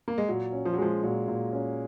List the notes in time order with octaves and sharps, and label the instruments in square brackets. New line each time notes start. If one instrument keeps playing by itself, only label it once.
[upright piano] A#3
G#3
[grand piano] A#2 [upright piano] F#3
[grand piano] C#4
[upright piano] F3
F#3
[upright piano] F3 [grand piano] G#3
[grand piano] A#2 [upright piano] F#3
[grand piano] A#2
C#4